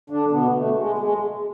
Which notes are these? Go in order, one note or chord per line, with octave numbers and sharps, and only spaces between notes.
D3 D4
B2 B3
A3
G#3
G#3